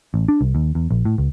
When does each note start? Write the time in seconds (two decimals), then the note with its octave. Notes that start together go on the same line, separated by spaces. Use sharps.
0.14 A1
0.28 D4
0.41 C2
0.55 D#2
0.75 E2
0.91 A#1
1.05 A2
1.18 C#2